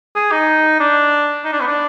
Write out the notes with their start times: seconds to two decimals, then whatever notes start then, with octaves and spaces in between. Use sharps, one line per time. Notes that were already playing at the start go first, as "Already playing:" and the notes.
0.15 G#4
0.31 D#4
0.80 D4
1.45 D#4
1.52 D4
1.60 B3
1.67 D4